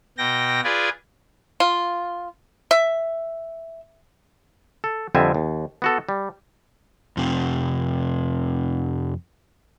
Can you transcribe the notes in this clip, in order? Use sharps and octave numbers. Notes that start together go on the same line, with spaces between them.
B2 G5 A#6
F4 G#4 B4 D5 G#5
F4
E5
A4
F2 D3 G3 C4 E5 G#5
D#2
B3 F#4 A4
G3
F2 C3